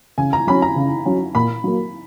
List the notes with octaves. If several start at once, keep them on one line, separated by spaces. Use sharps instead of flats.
C#3 G#5
A#5
F#3 C#4 B5
A#5
C#3
F#3 C#4
A#2 B5
F#3 A#3